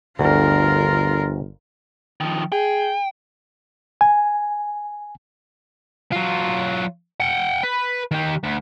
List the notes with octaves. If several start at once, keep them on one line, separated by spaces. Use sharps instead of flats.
G1 D2 F4 A#4
D#3 F3
G#4 G5
G#5
F#3 F4
F#5 G5
B4
D#3 G4
D2